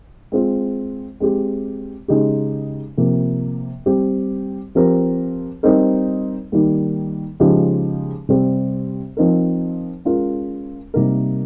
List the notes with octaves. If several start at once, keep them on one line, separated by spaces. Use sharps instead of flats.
G#3 C4 F4
G#3 C4 G4
C#3 G#3 D#4 G4
C3 F3 A#3
G3 C4 G4
F3 C4 G4 A#4
G3 C4 D#4 A#4
D#3 G3 A#3
C#3 F3 G#3 D#4 G4
C3 G3 C4 G4
F3 C4 D#4 A#4
G#3 C#4 F4 A#4
C3 G3 A#3 D#4 A#4